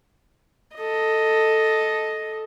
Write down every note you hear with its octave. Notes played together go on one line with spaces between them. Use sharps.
A4 D#5